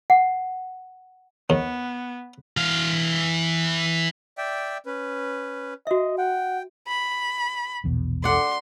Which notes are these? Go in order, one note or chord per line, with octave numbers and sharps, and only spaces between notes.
F#5
D#2 B3
E3 F5
D5 E5 G5
C#4 B4
F#4 D#5 E5
F#5 G5
B5
A#1 E2 B2
D5 F#5 C6